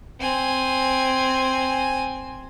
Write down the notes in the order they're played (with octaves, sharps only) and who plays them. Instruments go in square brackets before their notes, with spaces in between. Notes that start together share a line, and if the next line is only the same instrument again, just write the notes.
[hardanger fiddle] C4 G#5